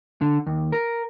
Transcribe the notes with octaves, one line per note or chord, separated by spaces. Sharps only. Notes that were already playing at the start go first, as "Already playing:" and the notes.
D3
D#2
A#4